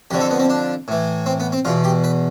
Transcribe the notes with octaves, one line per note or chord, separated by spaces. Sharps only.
F2 D3 F3 G4
A4
B3
C4
D4
A2 E3
C4
B3
C4
E2 B2 F4
G4
B4